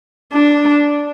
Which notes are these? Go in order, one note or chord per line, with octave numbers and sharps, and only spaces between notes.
D4